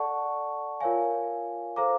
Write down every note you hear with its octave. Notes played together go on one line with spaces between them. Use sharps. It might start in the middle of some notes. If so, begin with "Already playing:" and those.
Already playing: A4 D5 F#5 A5 C#6
F4 A#4 C#5 F5 G#5
A4 C5 F5 A#5 D6